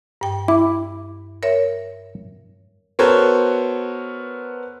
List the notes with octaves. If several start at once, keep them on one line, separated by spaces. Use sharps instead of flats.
G2 G5
E4 D6
A#4 C#5 E5
B3 F#4 A4 A#4 C5 C#5